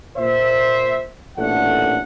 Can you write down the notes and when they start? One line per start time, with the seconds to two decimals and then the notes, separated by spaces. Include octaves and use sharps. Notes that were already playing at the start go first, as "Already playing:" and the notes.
0.17 A#2 C5 E5
1.37 A1 A#2 A3 D4 F#5